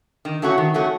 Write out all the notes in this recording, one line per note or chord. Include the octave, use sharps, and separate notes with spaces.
D#3
F#3 A3 C#4 F#4
D#3
F#3 A3 C#4 F#4